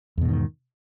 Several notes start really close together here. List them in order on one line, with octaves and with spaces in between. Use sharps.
E2 B2 G#2 D#3